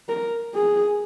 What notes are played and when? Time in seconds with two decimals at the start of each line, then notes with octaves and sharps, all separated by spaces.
0.09 A#4
0.54 G#4